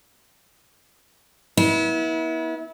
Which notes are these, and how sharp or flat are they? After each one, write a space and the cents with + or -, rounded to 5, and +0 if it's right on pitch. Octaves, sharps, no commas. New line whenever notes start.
B3 -35 E4 -30